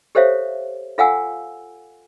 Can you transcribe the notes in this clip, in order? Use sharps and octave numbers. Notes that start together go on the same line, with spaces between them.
G4 A4 C5 C#5 E5 F5
F4 A4 F5 F#5 G#5 E6